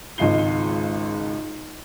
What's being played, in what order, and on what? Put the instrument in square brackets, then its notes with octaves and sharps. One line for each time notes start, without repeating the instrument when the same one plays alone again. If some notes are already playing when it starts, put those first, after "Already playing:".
[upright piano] G#1 C#2 D#5 C7 G7